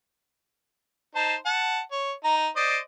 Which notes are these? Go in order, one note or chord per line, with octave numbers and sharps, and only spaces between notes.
D#4 C5 A5
F#5 A5
C#5
D#4 A#5
C5 D5 D#5